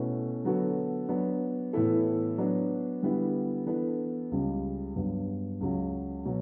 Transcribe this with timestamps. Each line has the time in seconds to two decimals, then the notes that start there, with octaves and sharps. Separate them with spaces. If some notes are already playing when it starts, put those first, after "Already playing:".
Already playing: B2 A3 C#4 E4 B4
0.44 D3 F#3 B3 F#4 A4
1.09 F#3 B3 D4
1.73 A2 E3 B3 E4 A4
2.38 F#3 B3 D4
3.03 D3 G3 B3 E4
3.66 E3 B3 D4 A4
4.32 C#2 C#3 G3
4.96 G2 F#3 B3
5.61 C#2 C#3 F#3
6.25 B2 F#3